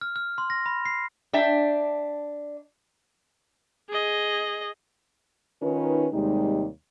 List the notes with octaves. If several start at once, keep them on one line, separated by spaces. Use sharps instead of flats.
F6
F6
C6
A#6
B5
C7
D4 E5 G5
G#4 D#5
D#3 C#4 D#4 F4 B4
D#2 C3 G3 G#3 D#4